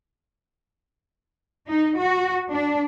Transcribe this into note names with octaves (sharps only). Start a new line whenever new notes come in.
D#4
F#4
D4